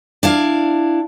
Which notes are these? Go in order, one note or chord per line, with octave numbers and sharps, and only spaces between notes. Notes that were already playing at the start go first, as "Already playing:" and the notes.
D4 E4 F5